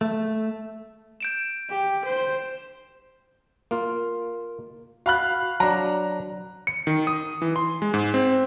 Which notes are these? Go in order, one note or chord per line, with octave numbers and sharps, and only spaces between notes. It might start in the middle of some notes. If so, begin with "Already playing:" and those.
A3
G6 D7 E7
G4
C5
A#3 F4
F#4 F5 B5 F#6
F#3 D4 A#5
C#7
D#3
D#6
E3
C6
G#3
G#2
C4